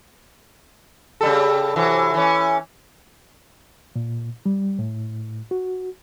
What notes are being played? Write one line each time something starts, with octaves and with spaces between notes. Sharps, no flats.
C#3 G3 A4
C3 E3 F#3
E3 C#4
A#2
G3
A2
F#4